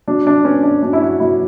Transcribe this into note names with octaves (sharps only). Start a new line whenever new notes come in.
F#3 D4
D4
B3 C#4
D4
F#3 D4
E4
F#4
F#3 E4